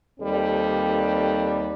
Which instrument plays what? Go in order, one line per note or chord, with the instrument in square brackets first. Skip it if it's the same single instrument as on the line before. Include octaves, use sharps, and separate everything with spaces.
[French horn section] D#2 G3 C4 A4